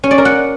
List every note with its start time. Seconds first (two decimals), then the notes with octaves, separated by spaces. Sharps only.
0.04 C#4
0.11 D5
0.18 A#4
0.25 F#5